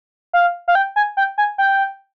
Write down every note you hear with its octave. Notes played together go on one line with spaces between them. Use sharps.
F5
F5
G5
G#5
G5
G#5
G5